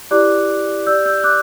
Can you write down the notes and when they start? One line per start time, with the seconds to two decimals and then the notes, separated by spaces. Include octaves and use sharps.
0.11 E4 G4 D5 D6 F#6
0.86 G4 D5 E6 G6
1.06 E6 G6
1.24 D6 F#6